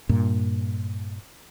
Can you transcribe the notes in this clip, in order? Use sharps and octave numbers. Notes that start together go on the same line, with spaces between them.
G2 A#2